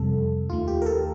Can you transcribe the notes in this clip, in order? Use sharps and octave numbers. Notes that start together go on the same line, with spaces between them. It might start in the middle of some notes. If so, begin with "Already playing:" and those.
Already playing: F2 C3 G3 A4
D#2 D#3 A3 F4
G4
A#4
A4